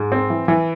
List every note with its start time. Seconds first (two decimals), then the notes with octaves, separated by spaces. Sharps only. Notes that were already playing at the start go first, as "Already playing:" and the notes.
Already playing: G#2
0.12 C4
0.30 E3
0.48 E3